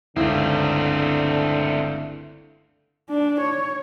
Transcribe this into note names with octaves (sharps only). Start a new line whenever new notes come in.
G1 C#2 D3 A3 C4 E4
D4
C#5